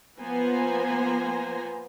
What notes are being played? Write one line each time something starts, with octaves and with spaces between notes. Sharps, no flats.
F3 A#3 B3 C5 G#5 A#5